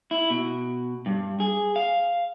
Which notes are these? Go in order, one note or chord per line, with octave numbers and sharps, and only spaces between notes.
E4
B2
G2
G#4
F5